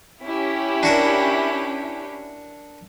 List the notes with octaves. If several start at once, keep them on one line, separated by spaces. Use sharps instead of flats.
C#4 E4 G4
D4 F#4 A#4